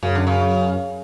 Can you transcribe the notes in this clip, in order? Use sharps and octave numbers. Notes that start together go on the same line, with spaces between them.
F#2 C#3
D3
C#3